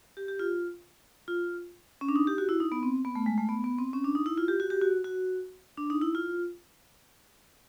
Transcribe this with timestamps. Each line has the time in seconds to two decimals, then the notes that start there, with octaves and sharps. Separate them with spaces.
0.17 G4
0.28 G4
0.39 F4
1.28 F4
2.01 C#4
2.08 D4
2.16 D#4
2.27 G4
2.38 F#4
2.49 E4
2.60 D#4
2.72 B3
2.83 C4
3.05 B3
3.15 A3
3.26 G#3
3.38 A3
3.49 B3
3.64 B3
3.78 C4
3.93 C#4
4.04 D4
4.15 D#4
4.26 E4
4.37 F4
4.48 G4
4.60 F#4
4.70 G4
4.81 F#4
5.04 F#4
5.77 D4
5.90 D#4
6.02 E4
6.15 F4